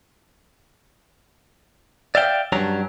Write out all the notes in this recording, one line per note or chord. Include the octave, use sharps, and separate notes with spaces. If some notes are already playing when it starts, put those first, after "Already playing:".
D5 E5 F5 G5
G2 F#3 C#4 D4 A#5